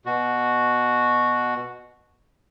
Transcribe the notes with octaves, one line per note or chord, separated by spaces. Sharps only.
B2 F#4